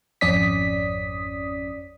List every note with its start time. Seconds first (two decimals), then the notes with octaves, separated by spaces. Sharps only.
0.21 G#1 F2 C#4 D5 D#6 B6